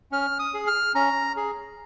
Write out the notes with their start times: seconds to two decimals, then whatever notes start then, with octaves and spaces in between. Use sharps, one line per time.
0.12 C#4 F6
0.39 D#6
0.54 G#4
0.67 F6
0.95 C#4 A#5
1.37 G#4